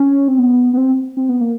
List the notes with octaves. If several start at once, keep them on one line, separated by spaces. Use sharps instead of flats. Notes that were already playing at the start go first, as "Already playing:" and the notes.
Already playing: C#4
C4
B3
B3
C4
C4
B3
A#3